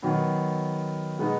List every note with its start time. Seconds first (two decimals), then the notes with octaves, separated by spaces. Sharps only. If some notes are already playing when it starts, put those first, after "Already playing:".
0.02 D#3 F#3 B3
1.18 B2 G#3 B3 D#4